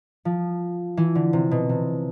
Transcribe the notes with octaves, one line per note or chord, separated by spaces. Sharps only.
F3
E3
D3
C3
B2
C3